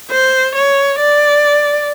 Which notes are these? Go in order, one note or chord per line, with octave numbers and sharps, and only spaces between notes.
C5
C#5
D5